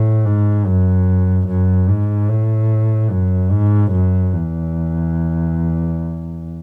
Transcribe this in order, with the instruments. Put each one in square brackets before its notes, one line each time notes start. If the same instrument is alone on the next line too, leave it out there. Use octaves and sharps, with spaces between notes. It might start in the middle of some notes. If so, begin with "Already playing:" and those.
Already playing: [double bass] A2
G#2
F#2
F#2
G#2
A2
F#2
G#2
F#2
E2